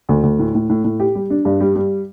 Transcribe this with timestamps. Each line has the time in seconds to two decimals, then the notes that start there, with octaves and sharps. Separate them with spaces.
0.09 D2
0.23 D2
0.39 A2
0.54 A2
0.69 A2
0.84 A2
1.00 G4
1.15 G3
1.30 D4
1.45 G2
1.61 G3
1.75 G3